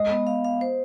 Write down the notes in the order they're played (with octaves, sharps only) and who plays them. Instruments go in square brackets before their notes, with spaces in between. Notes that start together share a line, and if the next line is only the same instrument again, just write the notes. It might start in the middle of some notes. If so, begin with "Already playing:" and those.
Already playing: [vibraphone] G#3 [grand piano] D#5
[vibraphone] B3
F5
F5
C5